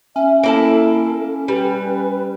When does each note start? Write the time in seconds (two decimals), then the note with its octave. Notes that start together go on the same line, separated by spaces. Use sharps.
0.16 C#4 E5
0.43 A#3 E4 A4 A5
1.48 G3 B4